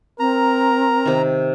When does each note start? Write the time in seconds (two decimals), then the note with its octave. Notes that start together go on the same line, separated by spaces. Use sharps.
0.20 C4 A#4 A#5
1.06 C3 D#3